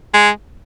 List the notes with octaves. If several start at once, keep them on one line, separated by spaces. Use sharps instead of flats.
G#3